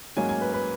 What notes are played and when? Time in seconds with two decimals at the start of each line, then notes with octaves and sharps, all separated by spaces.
0.17 G#2 F#3 A#3 C#4 G#5
0.29 G#5
0.41 B4
0.53 B4